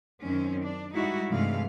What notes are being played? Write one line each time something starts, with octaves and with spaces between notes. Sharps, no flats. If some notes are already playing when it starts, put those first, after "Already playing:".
F#2 D#3 C4 C#4
D4
G3 G#3 D#4 E4 F#4
G2 C3 E3 G#3 A3 F5